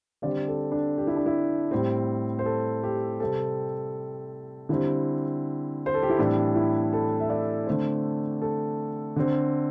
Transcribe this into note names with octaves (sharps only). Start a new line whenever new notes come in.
D3 G3 C4 D5
A4
D4
G4
E4
D4
E4
A2 G3 C4
C5
A4
G4
C3 G3 C4 A4
D3 G3 C4 E4
C5
A4
G4
E4
A2 E3 G3 C4 D4
E4
A4
E5
D5
D3 A3 C4 C5
A4
D3 C4